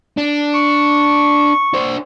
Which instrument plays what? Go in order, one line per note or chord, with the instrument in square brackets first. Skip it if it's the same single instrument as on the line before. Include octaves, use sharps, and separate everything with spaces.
[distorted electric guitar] D4
[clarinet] C#6
[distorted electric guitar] D4 C5